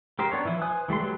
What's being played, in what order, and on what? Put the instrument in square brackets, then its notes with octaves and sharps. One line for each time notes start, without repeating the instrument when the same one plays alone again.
[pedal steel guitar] A#3 G4 A#4 C5
B3 D4 C#5
E3 F3 E4
B4 C5 G#5 D#6 F#6
E3 G3 A3 C6
F#3 A3 G4 B4